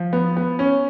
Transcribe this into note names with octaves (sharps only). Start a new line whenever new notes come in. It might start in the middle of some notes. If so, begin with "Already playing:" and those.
Already playing: F3
B3
B3
C#4